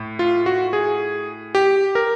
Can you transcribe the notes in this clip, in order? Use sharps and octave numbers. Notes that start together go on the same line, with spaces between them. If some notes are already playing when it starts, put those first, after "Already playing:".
Already playing: A2
F4
F#4
G#4
G4
A#4